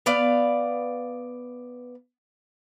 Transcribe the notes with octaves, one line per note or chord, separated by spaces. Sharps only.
B3 D5 F5